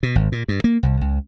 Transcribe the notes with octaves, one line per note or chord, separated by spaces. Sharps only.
B2
G#1
A#2
G2
A#3
C2
C#2